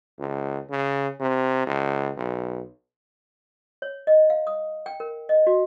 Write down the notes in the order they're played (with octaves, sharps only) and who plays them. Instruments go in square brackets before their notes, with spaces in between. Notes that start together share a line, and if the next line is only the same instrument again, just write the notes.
[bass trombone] C#2
C#3
C3
C#2
B1
[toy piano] C#5
D#5
F5
D#6
G5
A#4
D#5
F#4